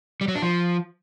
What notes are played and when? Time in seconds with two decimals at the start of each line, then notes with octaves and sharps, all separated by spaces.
0.21 G3
0.28 F#3
0.35 D4
0.42 F3